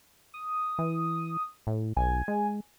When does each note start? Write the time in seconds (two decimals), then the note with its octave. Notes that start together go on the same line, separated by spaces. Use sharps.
0.34 D#6
0.78 E3
1.67 A2
1.96 B1 G#5
2.28 G#3